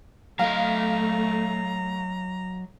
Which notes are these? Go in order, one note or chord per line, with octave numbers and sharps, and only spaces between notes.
F#3 A3 D#5 F5 A#5